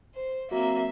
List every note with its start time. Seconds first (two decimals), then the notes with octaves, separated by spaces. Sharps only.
0.15 C5
0.51 F#3 A#3 C4 F#4 E5